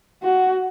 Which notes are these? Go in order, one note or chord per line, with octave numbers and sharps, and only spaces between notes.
F#4